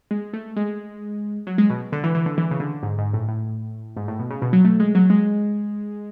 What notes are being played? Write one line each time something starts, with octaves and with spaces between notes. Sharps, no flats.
G#3
A3
G#3
F#3
G#3
B2
D3
E3
E3
D3
E3
C#3
D3
G#2
G#2
A2
A2
G#2
A2
B2
C#3
B2
F#3
A3
G#3
F#3
G#3